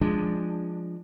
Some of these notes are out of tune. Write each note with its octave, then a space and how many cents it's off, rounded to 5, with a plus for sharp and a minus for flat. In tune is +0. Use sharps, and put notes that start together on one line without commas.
F3 +0 G#3 -5 D4 +0